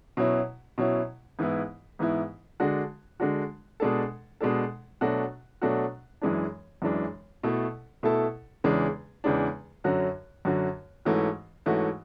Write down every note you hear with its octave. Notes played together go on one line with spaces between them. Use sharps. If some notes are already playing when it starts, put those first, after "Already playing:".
B2 F#3 C#4 E4
B2 F#3 C#4 E4
G#2 E3 B3 E4
G#2 E3 B3 E4
D3 G#3 D4 F#4
D3 G#3 D4 F#4
B2 G#3 D4 A4
B2 G#3 D4 A4
B2 F#3 A3 D4 F#4
B2 F#3 A3 D4 F#4
F#2 E3 G#3 D4
F#2 E3 G#3 D4
B2 A3 E4 A4
B2 A3 E4 A4
E2 C#3 E3 G#3 D4
E2 C#3 E3 G#3 D4
F#2 D3 F#3 C#4 F#4
F#2 D3 F#3 C#4 F#4
G#2 E3 A3 C#4 F#4
G#2 E3 A3 C#4 F#4